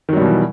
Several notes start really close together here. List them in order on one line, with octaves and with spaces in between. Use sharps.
D#3 F#3 G3 B2 E3